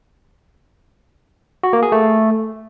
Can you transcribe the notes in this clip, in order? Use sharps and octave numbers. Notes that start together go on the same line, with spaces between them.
F#4
A#3
G#4
A3